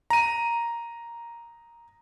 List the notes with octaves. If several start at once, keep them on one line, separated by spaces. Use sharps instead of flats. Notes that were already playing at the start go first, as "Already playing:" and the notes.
A#5 D#7